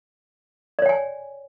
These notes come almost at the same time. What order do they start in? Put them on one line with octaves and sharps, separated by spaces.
D5 C#5 G5 G#5